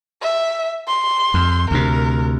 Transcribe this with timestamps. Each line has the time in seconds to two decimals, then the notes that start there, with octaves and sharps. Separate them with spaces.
0.22 E5
0.88 C6
1.34 F2
1.71 D2 C3 A#4